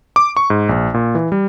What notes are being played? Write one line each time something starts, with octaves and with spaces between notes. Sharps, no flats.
D6
C#6
G#2
A#1
A#2
E3
G3